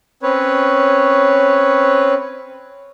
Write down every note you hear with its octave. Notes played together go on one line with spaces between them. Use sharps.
C4 C#4 B4 C#5